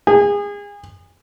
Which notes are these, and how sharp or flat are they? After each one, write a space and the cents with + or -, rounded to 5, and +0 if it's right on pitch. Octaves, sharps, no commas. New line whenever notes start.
G#4 -30